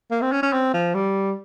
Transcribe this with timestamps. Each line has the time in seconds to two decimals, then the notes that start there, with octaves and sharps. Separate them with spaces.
0.11 A#3
0.22 C4
0.32 C#4
0.43 C#4
0.53 C4
0.74 F3
0.95 G3